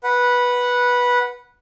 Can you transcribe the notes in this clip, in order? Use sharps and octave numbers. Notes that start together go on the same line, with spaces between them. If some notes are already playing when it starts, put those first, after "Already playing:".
B4 F#5